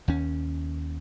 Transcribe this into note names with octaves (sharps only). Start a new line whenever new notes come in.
D#2 C#4